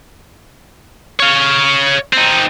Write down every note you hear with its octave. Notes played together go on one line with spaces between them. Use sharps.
C#5 F5
C4 D#4